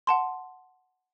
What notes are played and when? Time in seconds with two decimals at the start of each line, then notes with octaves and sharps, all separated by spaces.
0.07 F#5 A5 C6